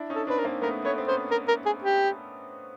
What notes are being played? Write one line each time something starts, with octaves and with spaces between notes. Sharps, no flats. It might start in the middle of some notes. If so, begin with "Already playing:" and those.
Already playing: D4 E4
C#4 D#4
A4
C4 D4 B4
A#4
A#3 C4
A3 B3 A#4
A3 B3 C#5
C4
B3 C#4 C5
A#4
A#4
G#4
G4